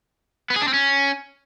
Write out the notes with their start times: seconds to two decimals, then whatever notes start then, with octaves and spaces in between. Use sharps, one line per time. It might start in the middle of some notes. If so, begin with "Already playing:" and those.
0.50 B3
0.56 G#4
0.62 D4
0.68 C4
0.74 C#4